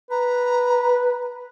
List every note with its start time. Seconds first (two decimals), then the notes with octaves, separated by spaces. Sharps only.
0.11 B4 A#5